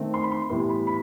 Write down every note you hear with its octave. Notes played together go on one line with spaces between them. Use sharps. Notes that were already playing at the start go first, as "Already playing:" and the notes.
Already playing: D#3 A3 C4
C6
B5
C6
A2 E3 G3 B3 C6
B5
B5